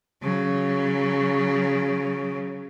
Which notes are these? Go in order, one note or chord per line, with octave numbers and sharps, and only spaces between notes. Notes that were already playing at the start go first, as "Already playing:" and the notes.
C#3 F#3